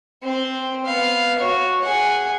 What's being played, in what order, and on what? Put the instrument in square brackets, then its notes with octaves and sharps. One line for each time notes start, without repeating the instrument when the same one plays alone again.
[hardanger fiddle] C4 C5
B3 F5
F#4 C#5
G#4 F#5